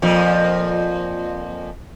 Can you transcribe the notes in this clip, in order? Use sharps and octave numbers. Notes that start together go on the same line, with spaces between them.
F2 A#2 F3